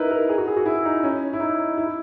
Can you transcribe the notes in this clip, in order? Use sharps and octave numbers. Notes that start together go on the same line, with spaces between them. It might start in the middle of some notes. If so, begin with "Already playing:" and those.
Already playing: D#4 E4 A#4 B4
A#4
G#4
F#4
G#4
F#4
E4
D#4
C#4
E4
D#4
E4